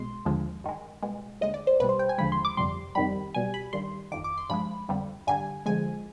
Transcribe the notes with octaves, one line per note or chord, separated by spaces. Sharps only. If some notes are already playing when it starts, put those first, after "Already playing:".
Already playing: B1 B2 G#3 C6
D#2 D3 F3 G#3
G2 D#3 G#3
C2 B2 G#3
D#2 D3 G#3 D#5
D5
C5
B1 B2 G3 B4
C5
G5
G#5
D#2 D3 F3 G#3 B5
C6
D6
G1 F2 C3 G3 C6
F2 C3 D#3 G3 B5
B1 B2 G3 G#5
B5
G2 D#3 G3 C6
G1 F2 D#3 D6
D6
C6
G2 F3 G#3 B5
G1 F2 D3 G3
G2 D3 G3 G#5
F2 D3 F3 G#3 G#5